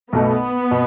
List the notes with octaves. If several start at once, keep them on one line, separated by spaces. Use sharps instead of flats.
B1 B2 A3 B3
B2